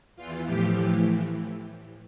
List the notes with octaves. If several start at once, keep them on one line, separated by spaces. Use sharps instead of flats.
E2 E3 F4
A2 F3 G4
A2 E3